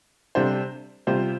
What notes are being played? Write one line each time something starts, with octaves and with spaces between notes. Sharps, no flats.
C3 G3 D4 A4 C5
C3 G3 F4 C5